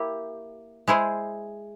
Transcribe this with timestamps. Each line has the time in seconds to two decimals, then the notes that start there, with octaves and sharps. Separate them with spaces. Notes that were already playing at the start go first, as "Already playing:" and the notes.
Already playing: A#3 E4 G4
0.88 G#3 E4 G#4 C5